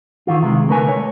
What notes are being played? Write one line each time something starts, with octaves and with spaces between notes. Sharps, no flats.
D#3 E3 F4
C3 D#3 G#3
D3 A3 A#4 B4 G#5
C#5